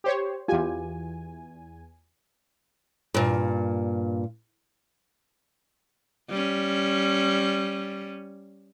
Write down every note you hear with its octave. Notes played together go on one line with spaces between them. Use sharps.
G4 C5 C#5
E2 F4 G4 G#5
G2 A#2
G3 C#4